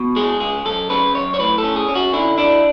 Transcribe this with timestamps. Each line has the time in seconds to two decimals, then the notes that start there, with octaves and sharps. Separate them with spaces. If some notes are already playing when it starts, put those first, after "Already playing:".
Already playing: B2
0.16 G#3 G#4
0.40 C#2 G#4
0.65 F#2 A4
0.90 C#3 B4
1.14 F#2 C#5
1.34 C#5
1.39 A2 B4
1.58 A4
1.64 C#4
1.76 G#4
1.89 C#4
1.95 F#4
2.13 D3 E4
2.38 D4 E4